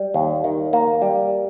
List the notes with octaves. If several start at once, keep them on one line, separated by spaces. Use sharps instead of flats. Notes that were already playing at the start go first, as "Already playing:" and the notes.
Already playing: G3
D#2
D#3
A#3
G3